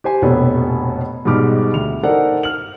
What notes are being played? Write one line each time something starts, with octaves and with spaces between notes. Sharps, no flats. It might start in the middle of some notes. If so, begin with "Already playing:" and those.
G4 C5 G#5
F1 A#1 B2 B3 A4 C#5
G#2 B2 G3 G4 D6 F6
D2 F7
D#4 A4 A#4 C5 D5 F#5
F6 F#7